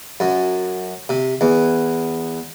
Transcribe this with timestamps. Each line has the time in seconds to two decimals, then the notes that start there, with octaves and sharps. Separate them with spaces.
0.20 F#2
1.09 C3
1.41 E2